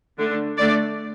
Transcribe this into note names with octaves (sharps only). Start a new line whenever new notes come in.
D3 A3 D4
D3 A3 D4 D5